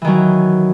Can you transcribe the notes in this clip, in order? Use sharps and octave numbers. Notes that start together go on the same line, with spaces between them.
D#3 E3 F#3